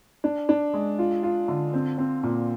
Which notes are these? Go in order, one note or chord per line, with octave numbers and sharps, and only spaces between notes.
D4
D4
G#3
F4
F4
D3
C4
C4
A#2